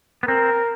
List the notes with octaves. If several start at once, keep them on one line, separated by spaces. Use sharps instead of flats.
B3
C4 A#4